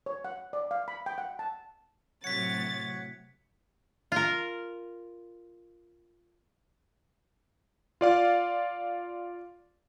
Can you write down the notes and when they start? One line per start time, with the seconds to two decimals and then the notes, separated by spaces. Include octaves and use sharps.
0.06 C#5
0.25 F#5
0.53 D5
0.71 F5
0.88 B5
1.06 G5
1.18 F#5
1.39 A5
2.24 A2 C3 F#3 C#5 F#5 A6 B6 C#7
4.12 F4 A#4
8.01 F4 D5 F5